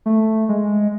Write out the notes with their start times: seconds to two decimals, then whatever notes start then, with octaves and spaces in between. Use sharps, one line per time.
0.06 A3
0.49 G#3